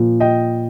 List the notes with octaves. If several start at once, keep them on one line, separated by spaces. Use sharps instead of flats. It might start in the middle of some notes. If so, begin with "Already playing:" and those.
Already playing: A#2 F3
D#5 G5